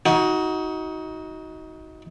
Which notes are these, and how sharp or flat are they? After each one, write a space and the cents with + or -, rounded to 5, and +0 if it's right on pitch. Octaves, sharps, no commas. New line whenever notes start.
D#4 +25 F#4 +0